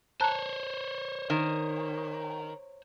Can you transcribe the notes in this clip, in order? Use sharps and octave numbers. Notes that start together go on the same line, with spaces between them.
C5 C#5 A5 A#5 F#6
D#3